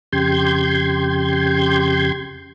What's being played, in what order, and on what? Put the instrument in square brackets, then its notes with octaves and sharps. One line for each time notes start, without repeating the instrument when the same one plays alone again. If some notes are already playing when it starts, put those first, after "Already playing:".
[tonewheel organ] F2 C#3 G4 C6 G6 G#6